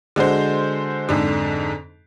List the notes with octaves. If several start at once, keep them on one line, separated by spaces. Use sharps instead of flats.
D3 G#3 F#4 C5
F2 G#2 D3